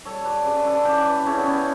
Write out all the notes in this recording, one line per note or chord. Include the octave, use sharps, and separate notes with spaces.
G3 A4 C#5
B4 D5
C#3 B4 D5
D5
A4 C#5
E3 G4 B4
B4 D5
C#3 C#4 E4
B3
C#4